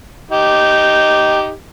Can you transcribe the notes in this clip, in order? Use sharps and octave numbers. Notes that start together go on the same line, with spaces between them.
D#4 G4